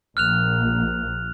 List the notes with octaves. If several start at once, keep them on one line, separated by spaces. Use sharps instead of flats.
A#1 A#3 F6 F#6 F7